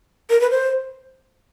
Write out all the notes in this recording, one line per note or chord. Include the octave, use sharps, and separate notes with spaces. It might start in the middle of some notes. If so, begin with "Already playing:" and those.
A#4
B4
C5